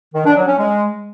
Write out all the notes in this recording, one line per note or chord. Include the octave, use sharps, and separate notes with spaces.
D#3
D4
F#3
C#4
G#3